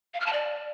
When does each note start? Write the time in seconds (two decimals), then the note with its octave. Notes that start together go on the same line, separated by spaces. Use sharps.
0.14 F5
0.20 F6
0.26 A5
0.33 D5